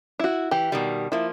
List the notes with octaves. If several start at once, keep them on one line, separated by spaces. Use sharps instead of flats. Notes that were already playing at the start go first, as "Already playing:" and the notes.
E4 F#4
E3 G4
B2 D#3 G3
F3 A#3 E4